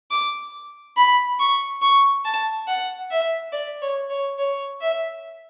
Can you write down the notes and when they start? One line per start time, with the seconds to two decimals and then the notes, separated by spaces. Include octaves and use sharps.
0.11 D6
0.97 B5
1.39 C#6
1.82 C#6
2.25 A5
2.68 F#5
3.11 E5
3.52 D5
3.82 C#5
4.10 C#5
4.38 C#5
4.81 E5